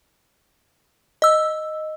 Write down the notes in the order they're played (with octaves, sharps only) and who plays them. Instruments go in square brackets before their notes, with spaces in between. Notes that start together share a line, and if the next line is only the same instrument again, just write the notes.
[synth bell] D#5 E6